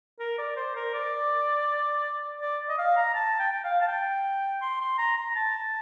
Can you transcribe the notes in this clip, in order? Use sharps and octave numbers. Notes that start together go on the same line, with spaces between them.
A#4
D5
C5
A#4
D5
D5
D#5
F5
A#5
A5
G5
G5
F5
A5
G5
C6
C6
A#5
A#5
A5